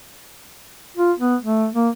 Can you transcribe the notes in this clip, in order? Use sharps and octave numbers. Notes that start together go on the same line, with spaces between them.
F4
B3
A3
A#3